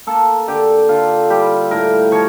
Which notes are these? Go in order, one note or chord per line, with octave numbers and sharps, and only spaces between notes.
A#3 A4
D3 G4
D3 F4
G3 G4
A2 A#4
F3 C#5